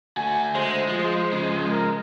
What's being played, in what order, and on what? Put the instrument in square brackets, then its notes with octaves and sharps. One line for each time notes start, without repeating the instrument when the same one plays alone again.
[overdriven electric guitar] A3 F#4 [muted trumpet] G#5
[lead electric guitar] G#3 [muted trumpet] C5
[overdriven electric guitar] F3
C#3 F3
[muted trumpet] A#4